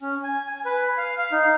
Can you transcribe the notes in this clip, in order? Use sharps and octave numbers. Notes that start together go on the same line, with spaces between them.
C#4
G#5
G#5
B4
F5
F5
D#4